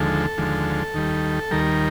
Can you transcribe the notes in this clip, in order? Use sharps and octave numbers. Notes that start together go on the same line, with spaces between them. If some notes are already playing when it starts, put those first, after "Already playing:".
Already playing: D#2 D3 F3 G#3 A4
D#2 D3 F3 G#3
D#2 D#3 G3
D#2 D#3 G3 A#4